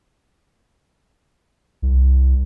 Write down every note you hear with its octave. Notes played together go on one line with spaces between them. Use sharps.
C2